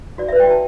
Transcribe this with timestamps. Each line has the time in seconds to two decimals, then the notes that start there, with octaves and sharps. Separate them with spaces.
0.18 F#4 D5
0.28 B4 E5
0.40 G5
0.47 F#4 A5